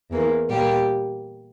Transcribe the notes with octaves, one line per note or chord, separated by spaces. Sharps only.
E2 E3 A#3
A#2 G3 A#3 G4